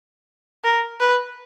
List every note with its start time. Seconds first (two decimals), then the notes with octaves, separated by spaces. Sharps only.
0.64 A#4
1.00 B4